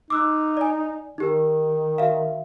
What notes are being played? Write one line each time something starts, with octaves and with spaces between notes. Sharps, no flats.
D#4 D6 E6 F#6
D5 G#5
D#3 D#4 G4 A#4
F#4 E5 F5